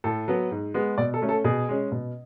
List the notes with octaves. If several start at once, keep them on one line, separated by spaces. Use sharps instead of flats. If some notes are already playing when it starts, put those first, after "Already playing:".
A2 A4
F#3 B3
G#2
G#3 B3
B2 D5
A4
A3 C#4
A4
B2 G#4
G#3 C#4
B2